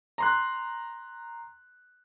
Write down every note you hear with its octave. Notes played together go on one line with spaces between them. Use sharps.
A#5 C6 F#6